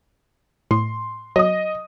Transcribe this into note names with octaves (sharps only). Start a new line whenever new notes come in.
A2 C6
F#3 D#5 D#6